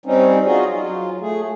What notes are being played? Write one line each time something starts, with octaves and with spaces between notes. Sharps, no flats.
G3 C4 C#4 D#4
D#4 F4 F#4 G#4 D#5
F#3 F4
A3 G#4